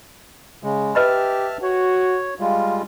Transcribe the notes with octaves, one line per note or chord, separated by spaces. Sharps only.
C#3 G#3
G4 B4 D#5 E5 A5 B5 F6
F#4 C#5
G3 G#3 F4 F5